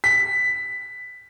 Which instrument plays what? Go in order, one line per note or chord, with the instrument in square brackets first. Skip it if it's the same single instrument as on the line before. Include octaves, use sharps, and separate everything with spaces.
[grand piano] B6